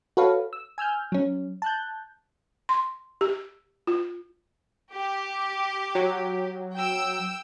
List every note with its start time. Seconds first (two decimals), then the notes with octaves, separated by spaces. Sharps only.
0.17 F#4 A4 B4 C#5 F5
0.53 E6
0.78 G#5 E6 F6 G6
1.12 F#3 C#4
1.62 A5 F#6 G6
2.69 C6
3.21 G4
3.87 F4
4.93 G4
5.95 F#3
6.74 G5 E6